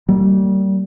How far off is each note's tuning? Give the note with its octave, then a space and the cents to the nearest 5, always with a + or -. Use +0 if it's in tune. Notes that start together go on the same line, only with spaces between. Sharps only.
G3 -30 A#3 -35